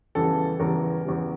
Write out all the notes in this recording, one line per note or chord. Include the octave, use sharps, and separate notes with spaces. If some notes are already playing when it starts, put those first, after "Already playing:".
E2 C#3 E3 G3 A4
E2 C#3 E3 G3 A#4
E2 C#3 E3 G3